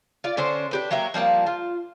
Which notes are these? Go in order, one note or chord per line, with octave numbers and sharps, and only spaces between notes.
F4 D5
D3 C#4 D4 C5
D4 G4 B4
F#3 A#3 G4 E5
F3 G3 A#3 A5
F4